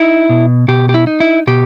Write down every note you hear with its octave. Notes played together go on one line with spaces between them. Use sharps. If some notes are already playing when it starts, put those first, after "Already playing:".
Already playing: D#4 E4
B2
B2 G4
G4
E4
D#4
E4
B2 G4